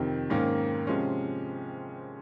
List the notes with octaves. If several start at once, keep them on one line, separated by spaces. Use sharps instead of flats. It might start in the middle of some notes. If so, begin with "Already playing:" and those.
Already playing: F2 C3 D#3
G#2 D#3 A#3 C#4
C3 F3 G#3 C#4